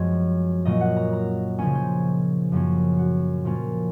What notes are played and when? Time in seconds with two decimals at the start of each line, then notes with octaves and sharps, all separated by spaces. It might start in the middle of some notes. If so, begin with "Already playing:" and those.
Already playing: F#2 F3 G#3 C4 C#5
0.65 A#2 F#3 A#3 C#4 D#5
0.81 F#5
0.96 A#5
1.13 A#5
1.59 C#3 F3 A#3 C#4 G#5
1.75 C5
2.52 F#2 C#3 F3 A#3 C#4
2.99 F#4
3.45 A#2 F3 A#3 C#4 F4